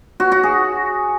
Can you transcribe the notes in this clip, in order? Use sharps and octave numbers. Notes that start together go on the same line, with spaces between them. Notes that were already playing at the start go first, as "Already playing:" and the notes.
F#4
F#4
G#4